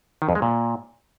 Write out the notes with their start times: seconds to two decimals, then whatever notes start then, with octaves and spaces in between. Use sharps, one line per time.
0.22 D#3
0.29 F2
0.35 G#3
0.42 A#2